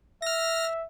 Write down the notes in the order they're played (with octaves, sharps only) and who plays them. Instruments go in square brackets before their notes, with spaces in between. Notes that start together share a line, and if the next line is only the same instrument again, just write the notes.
[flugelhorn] E5 [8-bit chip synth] F6 A#6